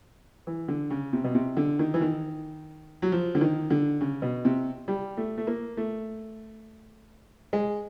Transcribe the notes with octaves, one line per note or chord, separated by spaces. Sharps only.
E3
D3
C#3
C3
B2
C3
D3
D#3
E3
D#3
F#3
F3
D3
D#3
D3
C#3
B2
C3
G3
A3
A3
A#3
A3
G#3